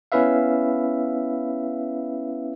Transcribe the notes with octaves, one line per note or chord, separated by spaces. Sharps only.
B3 C#4 E4 B4 E5 F5